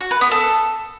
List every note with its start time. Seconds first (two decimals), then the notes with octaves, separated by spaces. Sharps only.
0.01 F#4
0.11 B4
0.21 B3
0.31 A4